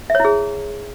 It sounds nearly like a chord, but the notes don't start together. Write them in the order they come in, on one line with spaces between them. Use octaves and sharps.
E5 C#5 E4 G#4